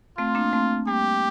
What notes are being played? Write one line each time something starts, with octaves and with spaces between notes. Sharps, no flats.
A3 C4 F4
A#3 D4
A3 C4
G3 A#3 G4